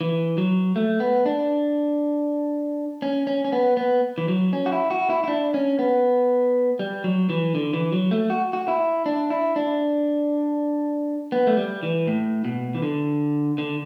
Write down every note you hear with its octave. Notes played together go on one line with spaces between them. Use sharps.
E3
F#3
A3
B3
D4
C#4
C#4
C#4
B3
B3
E3
F#3
C#4
F#4
E4
F#4
E4
E4
D4
C#4
B3
G3
F#3
E3
D3
E3
F#3
A3
F#4
F#4
E4
D4
E4
D4
B3
A3
G3
E3
A2
B2
E3
D3
D3